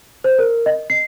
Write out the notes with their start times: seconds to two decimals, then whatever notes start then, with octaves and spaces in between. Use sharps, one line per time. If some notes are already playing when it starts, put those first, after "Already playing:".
0.24 C5
0.38 A#4
0.66 D#5
0.90 C7